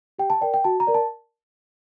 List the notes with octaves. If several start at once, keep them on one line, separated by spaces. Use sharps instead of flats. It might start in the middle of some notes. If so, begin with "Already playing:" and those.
G4 G5
A5
A#4 D5 G5
G5
F#4 A5
A#5
A#4 D5
A5